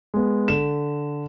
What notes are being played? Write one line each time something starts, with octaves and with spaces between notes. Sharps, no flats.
G#3 B3
D3 E7